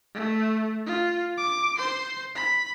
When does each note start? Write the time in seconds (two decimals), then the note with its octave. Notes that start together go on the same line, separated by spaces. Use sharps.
0.14 A3
0.86 F4
1.37 D6
1.78 C5 C6
2.35 B5